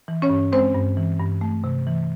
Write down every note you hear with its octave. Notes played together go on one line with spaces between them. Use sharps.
E3
C#4 C#5
G2
G#3 C4 C5
G2
E3
G2
A3
C3
E3